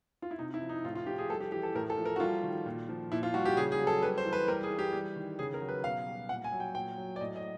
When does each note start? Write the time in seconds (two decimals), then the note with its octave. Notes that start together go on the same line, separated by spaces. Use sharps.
0.22 F4
0.31 E4
0.39 C3 D#4
0.54 E4
0.62 F3
0.69 D#4
0.84 A2 F4
0.95 F4
1.07 F3 G4
1.18 G#4
1.29 G3 A4
1.41 G4
1.52 E3 G4
1.63 A4
1.75 A2 A#4
1.90 A4
1.98 F3
2.05 A#4
2.16 F#4
2.20 G3 F4
2.43 D#3
2.66 A#2
2.89 F3
3.12 A#2 E4
3.23 F4
3.34 G3 F#4
3.45 G4
3.57 C#3 G#4
3.72 G#4
3.80 F#3
3.87 A4
4.02 G3 B4
4.18 C5
4.25 E3
4.33 B4
4.48 G3 A#4
4.63 G#4
4.70 E3
4.79 G4
4.93 G3
5.16 D#3
5.39 C#3 G#4
5.54 A#4
5.62 F#3
5.69 B4
5.84 B2 F5
6.07 G3
6.29 A#2 F#5
6.44 G#5
6.52 F#3
6.60 G5
6.75 A#2 G5
6.98 F#3
7.16 D5
7.21 A2 D#5
7.36 D#5